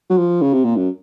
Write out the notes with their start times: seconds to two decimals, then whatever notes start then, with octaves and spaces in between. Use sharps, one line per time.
0.10 F#3
0.18 F3
0.42 C#3
0.53 C3
0.65 A#2
0.77 F#2